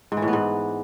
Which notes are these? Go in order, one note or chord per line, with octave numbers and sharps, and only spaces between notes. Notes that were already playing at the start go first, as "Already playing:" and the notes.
G#2
E3
A2
B3
G#2